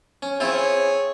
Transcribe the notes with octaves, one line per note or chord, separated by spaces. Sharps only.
C#4
C4 E4 F4 G#4 C#5